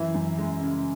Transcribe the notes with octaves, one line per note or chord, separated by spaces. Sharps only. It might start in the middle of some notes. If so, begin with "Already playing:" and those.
Already playing: F#2 E3 E4
F#2
G#3
C#3